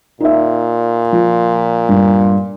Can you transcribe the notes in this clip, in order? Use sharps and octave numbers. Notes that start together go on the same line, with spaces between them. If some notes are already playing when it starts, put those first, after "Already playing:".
A#2 D#4 E5
F3
G2